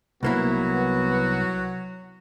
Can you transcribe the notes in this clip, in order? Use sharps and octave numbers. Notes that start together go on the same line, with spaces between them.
C2 F#3 A#3 B3 E4 F#4